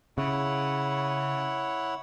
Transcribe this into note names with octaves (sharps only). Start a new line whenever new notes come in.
C#3 E4 C#5 F#5